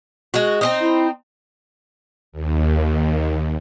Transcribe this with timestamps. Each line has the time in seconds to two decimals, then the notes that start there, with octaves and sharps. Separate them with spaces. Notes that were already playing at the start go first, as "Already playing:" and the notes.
0.34 G#3 F#4
0.61 C4 C#4 D#4
0.81 E4
2.32 D#2